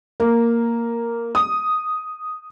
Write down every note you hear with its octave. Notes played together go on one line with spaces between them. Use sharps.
A#3
D#6